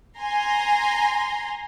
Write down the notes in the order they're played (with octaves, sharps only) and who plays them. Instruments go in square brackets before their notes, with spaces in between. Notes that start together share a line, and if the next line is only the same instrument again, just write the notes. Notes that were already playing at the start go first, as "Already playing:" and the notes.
[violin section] G#5 A#5 C6